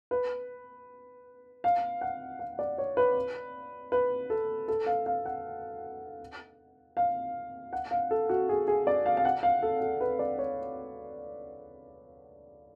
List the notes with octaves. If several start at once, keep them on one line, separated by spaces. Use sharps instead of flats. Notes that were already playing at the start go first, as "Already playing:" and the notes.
B4
F5
F#5
F5
D5
C#5
B4
B4
A4
A4
F5
F5
F#5
F5
F#5
F5
A4
F#4
G#4
G#4
D5
F5
F5
F#5
F5
A4
A4
B4
D5
C#5